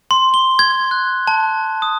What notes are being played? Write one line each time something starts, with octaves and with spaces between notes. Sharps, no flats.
C6
G7
G#6
F#6
A5
D#6